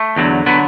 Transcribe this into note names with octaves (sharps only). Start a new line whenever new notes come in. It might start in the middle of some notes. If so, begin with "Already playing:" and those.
Already playing: A3
E2 D3 F#3
D3 F#3 B3